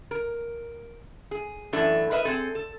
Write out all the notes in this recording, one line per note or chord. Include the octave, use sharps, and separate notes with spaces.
A#4
G#4
F#2 E3 A3 D4 A4
A#4 B4 D#5 E5
C4 G#4 A4
A4